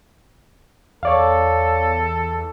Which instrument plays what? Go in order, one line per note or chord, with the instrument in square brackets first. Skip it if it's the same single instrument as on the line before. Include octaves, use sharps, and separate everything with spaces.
[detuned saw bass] E2 [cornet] A4 [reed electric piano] C#5 D5 F5